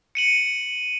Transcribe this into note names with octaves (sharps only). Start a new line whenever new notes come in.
C#7 D#7 F#7